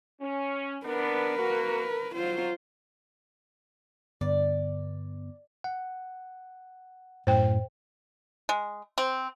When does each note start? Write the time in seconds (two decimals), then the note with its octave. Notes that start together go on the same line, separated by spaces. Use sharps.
0.21 C#4
0.85 B3 D4 A#4 B4
1.38 A#3 F#4
2.15 F#3 F4 C5
4.21 G2 D3 B3 D5
5.64 F#5
7.27 F#2 A2 C5 G5
8.49 G#3
8.98 C4